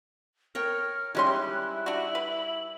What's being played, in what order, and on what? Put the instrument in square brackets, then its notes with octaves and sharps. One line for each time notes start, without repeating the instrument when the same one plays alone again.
[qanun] A#4 C#5 G5 [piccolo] F6
[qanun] G3 D#4 [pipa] G#3 C#4 C6 [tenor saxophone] E4 [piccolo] F#6
[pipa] D4 F#4 [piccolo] F#7
[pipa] B4